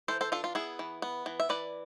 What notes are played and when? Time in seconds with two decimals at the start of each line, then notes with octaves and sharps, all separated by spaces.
0.08 E3 A4 C5
0.21 A4 C5
0.32 D4 F4 A4
0.44 F4
0.55 B3 E4 G#4
0.79 E3
1.02 B3
1.26 E3
1.40 E5
1.49 E3 B4 D5